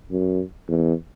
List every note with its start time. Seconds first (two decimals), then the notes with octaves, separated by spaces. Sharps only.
0.12 F#2
0.69 E2